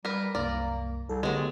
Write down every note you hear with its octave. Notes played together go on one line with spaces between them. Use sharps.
G3 A#4 B4
C2 F#2 A#3 A#4 D5
C2 A4
D3 F#3 G#3 A3 B3 G4